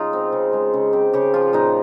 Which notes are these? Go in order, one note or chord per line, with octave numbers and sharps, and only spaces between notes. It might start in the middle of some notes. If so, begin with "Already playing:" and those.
Already playing: C#3 G#3 D#4 F4
C4
C#3
G#3
C#3
C4 G4
C#3 G4
F3 F4
A#2 D#4